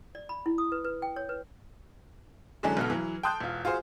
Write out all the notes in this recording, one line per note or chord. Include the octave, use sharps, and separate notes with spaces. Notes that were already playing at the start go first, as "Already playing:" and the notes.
D5
B5
E4
D#6
B4
B4
G5
C#5
B4
D3 E3 F#3 G#3 C#4 D4
B1 B2 F#4 A4 F6
E3 F#3
G5 A5 C6 D#6 F#6 G6
E1 F4
F4 F#4 G#4 C5